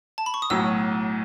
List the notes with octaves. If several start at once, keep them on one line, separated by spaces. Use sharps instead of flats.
A5
B5
C#6
D#6
B1 A2 F#3 E6